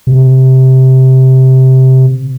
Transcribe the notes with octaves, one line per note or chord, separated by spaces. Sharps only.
C3